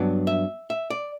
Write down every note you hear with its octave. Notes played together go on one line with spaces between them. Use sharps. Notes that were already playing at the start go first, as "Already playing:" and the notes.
Already playing: G2 F#3 B3 D4 D5
E5
E5
D5